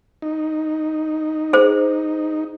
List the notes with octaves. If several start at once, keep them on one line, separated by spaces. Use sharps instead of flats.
D#4
G#4 C5